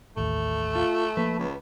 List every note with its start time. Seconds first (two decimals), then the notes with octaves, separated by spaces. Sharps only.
0.17 A1 D#2 A3
0.75 F4
1.17 F3 A#3 B4
1.39 C#2